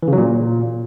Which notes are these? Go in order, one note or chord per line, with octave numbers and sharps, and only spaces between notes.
E3
C#3
F#3
A#2